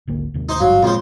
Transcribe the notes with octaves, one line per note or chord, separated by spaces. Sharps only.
G#1 D2 A#3
D#2 C3 D#3
D#4 C5
G#1 G2 F#3 F5
F2 A#2 C#3 G#3 C5